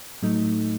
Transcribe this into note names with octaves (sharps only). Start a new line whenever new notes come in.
A2 F#3 A3 D#4